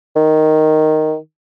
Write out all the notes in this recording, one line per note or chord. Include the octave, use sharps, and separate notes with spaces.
D#3